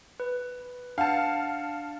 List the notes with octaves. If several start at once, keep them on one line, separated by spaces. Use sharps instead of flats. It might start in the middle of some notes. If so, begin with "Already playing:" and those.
B4
D4 F5 F#5 A5